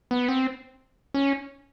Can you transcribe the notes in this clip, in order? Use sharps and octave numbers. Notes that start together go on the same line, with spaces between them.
B3
C4
C#4